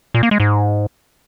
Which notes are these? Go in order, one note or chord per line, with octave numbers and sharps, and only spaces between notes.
A#2
A#3
G#3
G#2